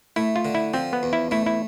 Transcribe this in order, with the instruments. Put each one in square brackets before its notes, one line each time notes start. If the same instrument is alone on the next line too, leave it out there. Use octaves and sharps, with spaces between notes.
[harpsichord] A3 [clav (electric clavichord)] E4
[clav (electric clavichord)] F4
[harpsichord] D3
[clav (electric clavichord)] E4
[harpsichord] F3 [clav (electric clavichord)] C4
[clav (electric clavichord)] B3
[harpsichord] E2
[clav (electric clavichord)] E4
[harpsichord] A3 [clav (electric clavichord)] E4
[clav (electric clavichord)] E4